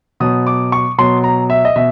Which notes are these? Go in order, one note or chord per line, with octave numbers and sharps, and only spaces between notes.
B2 F#3 D#6
D6
C#6
B2 F#3 C6
A#5
E5
D#5
B2 E5